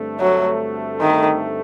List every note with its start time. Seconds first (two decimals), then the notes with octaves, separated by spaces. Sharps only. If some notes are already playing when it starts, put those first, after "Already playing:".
Already playing: G2 D3 A3 C4
0.20 F#3
1.01 D#3